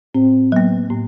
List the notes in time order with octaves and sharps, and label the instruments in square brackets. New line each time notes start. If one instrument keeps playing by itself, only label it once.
[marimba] A2 [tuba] C4
[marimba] F#3 A#3 [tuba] B3
[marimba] A2